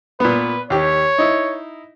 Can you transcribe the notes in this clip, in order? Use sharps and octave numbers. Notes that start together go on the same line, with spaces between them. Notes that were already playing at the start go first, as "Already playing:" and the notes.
A#2 B3 B4
D#2 G4 C#5
D#4 E4